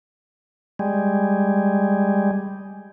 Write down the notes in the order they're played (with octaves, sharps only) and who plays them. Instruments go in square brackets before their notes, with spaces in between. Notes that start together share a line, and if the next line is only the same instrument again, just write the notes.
[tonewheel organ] G3 G#3